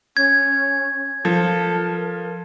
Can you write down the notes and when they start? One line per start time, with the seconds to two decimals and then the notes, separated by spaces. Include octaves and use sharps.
0.17 C#4 G#6
1.25 F3 A4 A#4